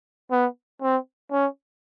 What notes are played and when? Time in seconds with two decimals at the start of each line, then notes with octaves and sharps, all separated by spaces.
0.31 B3
0.82 C4
1.32 C#4